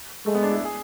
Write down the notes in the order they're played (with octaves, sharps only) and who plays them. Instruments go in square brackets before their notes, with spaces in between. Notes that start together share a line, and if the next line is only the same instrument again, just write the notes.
[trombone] G#3 [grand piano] A3
[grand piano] B3
D4
E4
G#4